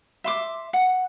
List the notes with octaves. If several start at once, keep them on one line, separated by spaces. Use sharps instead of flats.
E5 C6 D6
F#5